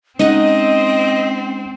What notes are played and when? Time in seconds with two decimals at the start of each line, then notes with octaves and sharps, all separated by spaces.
0.19 G#3 C4 C#4 D#4 D#5 F#5